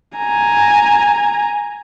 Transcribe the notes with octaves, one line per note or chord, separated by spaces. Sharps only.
G#5 A#5